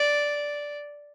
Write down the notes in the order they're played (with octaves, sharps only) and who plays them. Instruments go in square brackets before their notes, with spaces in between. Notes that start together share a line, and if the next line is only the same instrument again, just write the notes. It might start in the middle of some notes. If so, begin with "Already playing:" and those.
Already playing: [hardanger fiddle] D5